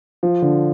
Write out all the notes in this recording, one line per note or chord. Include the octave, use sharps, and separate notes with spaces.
F3
D3